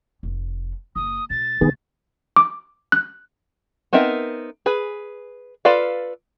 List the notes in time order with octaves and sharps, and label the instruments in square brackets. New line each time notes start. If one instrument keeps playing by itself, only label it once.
[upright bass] F1
[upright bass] F#1 [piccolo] D#6
[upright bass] B2 [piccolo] A6
[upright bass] C3 A3 [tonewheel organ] D#3 B3 G#4
[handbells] D6
F#6
[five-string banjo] B3 C4 D#4 A#4 E5
G#4 B4
F4 A4 B4 D5 F5